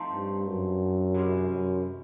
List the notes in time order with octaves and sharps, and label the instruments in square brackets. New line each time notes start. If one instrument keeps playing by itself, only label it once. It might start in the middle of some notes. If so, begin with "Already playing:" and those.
Already playing: [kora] F3 A3 C4 D#4
[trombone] G2
F#2
[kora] C3 E3 G#3 C#4
[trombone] F#2